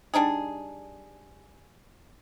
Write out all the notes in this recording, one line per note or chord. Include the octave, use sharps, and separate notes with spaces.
G3 D4 D#4 G#4